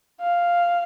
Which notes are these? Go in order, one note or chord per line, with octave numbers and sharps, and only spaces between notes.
F5